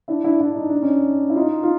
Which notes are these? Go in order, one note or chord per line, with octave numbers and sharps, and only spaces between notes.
D4 E4
D4 E4
D4 E4
D#4
D4
C#4 D#4
E4
D#4 F4
F4